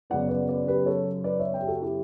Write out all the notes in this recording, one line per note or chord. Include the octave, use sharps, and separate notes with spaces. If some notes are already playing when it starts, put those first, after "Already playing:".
F#2 C#3 F#3 B3 D5 F#5
B4 D5
B4 D5
G4 B4
A4 C#5
B4 D5
C#5 E5
E5 G5
G4
F#4 A4
E4 G4